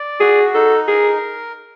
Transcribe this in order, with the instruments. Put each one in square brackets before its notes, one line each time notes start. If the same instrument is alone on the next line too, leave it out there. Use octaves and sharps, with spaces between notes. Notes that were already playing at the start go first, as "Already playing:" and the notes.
Already playing: [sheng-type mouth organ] D5
[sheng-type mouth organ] F#4 [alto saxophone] G#4
[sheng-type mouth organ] D#4 [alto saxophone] A4
[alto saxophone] G#4 [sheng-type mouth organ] A#4